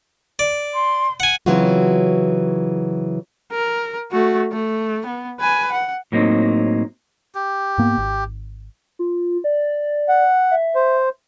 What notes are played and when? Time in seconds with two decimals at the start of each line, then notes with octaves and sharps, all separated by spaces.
0.39 D5
0.73 C6
1.20 F#5 G#5
1.46 C#3 E3 F#3 C4 F4 F#4
3.52 A#4
4.12 A3 F#4
4.52 A3
5.06 B3
5.40 B4 G#5
5.72 F#5
6.12 A2 F#3 A#3 C4 D#4
7.35 G4
7.78 G#2 A#3 B3
7.98 G#1
8.99 F4
9.44 D5
10.09 F#5
10.51 E5
10.75 C5